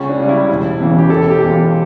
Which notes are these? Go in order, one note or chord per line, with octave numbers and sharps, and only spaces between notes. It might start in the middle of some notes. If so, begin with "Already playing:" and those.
Already playing: C#2 C#4
D4
C#3 G3
E4
E1
E2 C#3 E3
G4
E1 A4
G4
E2 E3
F4